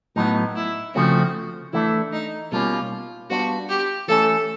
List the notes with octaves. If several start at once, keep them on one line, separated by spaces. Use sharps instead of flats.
A2 F#3 B3 D#4
E4
C#3 F3 A3 C4 F#4
E3 A3 D4 E4
D#4
B2 G3 A#3 C#4 F4
G3 B3 D4 F4 F#4
G4
E3 A3 C#4 A4